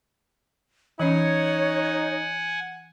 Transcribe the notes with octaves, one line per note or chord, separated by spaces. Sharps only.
E3 C#4 D#4 C#5 F#5 G#5